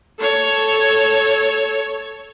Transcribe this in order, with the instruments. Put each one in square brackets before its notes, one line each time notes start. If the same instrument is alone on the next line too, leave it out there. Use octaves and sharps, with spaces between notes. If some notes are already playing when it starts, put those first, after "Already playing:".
[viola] A4 C#5